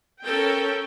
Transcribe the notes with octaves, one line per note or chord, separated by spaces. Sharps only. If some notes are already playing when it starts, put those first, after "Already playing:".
C#4 A4 A#4 G5